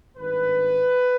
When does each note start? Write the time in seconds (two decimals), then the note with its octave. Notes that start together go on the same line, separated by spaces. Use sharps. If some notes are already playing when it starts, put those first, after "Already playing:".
0.16 G#1 G2 D#3 B4